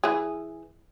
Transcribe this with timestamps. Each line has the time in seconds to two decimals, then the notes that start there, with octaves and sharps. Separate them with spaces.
0.04 E3 G#4